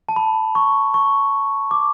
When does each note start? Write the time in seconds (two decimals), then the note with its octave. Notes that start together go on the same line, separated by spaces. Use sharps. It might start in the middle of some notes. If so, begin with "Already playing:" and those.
0.09 A5
0.16 B5
0.55 C#6
0.94 C#6
1.71 D6